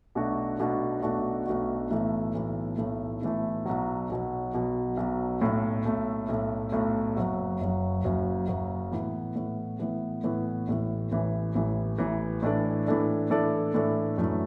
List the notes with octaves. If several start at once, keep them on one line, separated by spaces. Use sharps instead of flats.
B1 B2 A3 D4 F#4
B1 B2 A3 D4 F#4
B1 B2 A3 D4 F#4
B1 B2 A3 D4 F#4
B1 A2 E3 A3
B1 A2 E3 A3
B1 A2 E3 A3
B1 A2 E3 A3
B1 B2 F#3
B1 B2 F#3
B1 B2 F#3
B1 B2 F#3
B1 A2 A3
B1 A2 A3
B1 A2 A3
B1 A2 A3
F#1 F#2 F#3
F#1 F#2 F#3
F#1 F#2 F#3
F#1 F#2 F#3
A2 E3 B3
A2 E3 B3
A2 E3 B3
A2 E3 B3
A1 A2 E3
A1 A2 E3
A1 A2 E3
A1 A2 E3
A2 E3 D4 A4 D5
A2 E3 D4 A4 D5
A2 E3 D4 A4 D5
A2 E3 D4 A4 D5
F#2 E3 A3 D4